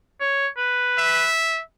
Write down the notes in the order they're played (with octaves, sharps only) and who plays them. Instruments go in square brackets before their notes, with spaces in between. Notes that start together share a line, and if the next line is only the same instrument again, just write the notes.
[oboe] C#5
B4
[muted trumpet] E5